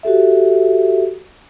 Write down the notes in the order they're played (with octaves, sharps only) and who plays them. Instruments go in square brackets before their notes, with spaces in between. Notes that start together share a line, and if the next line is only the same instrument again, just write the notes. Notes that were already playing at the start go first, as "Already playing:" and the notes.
[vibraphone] F#4 G4 A4 E5